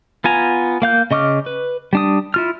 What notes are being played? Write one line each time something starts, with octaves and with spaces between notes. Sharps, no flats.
B3 F4 G#5 A#5
A#3 F5 G6
C#3 D#5 C#6 D6 F6
B4
G3 D4 D#6
E4 F4 F6